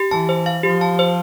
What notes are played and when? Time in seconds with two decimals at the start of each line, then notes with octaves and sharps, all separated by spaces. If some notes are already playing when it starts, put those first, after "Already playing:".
Already playing: G4
0.11 E3 A5
0.29 C5
0.46 F5
0.63 F3 G4
0.81 A5
0.99 C5